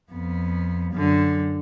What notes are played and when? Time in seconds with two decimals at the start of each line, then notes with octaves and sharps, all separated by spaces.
0.12 F2 B3
0.94 F#2 D3